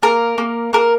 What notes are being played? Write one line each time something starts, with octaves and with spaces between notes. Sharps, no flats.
A#3 A#4
A#3
A#3 A#4